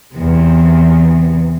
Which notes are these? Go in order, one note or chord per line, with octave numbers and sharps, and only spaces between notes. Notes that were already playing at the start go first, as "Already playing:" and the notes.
E2 C3